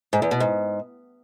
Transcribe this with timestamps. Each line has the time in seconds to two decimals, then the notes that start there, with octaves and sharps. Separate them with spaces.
0.13 G#2
0.22 E2
0.31 B2
0.40 G#2